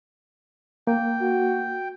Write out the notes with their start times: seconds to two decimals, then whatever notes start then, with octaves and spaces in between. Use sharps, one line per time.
0.87 A#3 G5
1.21 F#4